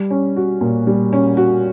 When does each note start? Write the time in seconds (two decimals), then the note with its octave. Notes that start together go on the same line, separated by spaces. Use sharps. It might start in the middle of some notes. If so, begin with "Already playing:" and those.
Already playing: G3
0.10 C#4
0.36 F#4
0.61 A#2
0.87 G3
1.13 C#4
1.37 F#4